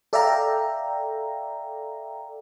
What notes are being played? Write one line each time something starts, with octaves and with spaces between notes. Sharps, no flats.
A4 D5 E5 F5 G5 A#5